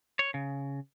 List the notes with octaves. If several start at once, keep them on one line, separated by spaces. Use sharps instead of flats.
C#5
C#3